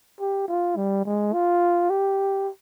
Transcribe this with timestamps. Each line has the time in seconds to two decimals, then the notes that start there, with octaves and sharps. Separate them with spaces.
0.20 G4
0.48 F4
0.76 G3
1.05 G#3
1.33 F4
1.90 G4